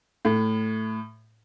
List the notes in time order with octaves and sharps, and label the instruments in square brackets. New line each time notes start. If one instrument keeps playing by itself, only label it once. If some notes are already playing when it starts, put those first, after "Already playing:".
[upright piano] A2